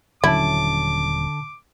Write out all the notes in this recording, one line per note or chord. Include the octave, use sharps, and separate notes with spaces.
D#1 D3 F#3 C#4 E4 A5 D6